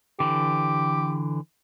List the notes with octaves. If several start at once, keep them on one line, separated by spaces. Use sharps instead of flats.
D3 E3 G4